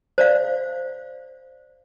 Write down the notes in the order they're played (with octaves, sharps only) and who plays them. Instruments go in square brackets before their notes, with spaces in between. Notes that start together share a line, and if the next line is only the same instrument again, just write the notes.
[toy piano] C5 D5 F5